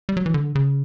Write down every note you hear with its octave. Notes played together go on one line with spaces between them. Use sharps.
G3
F#3
E3
D3
C#3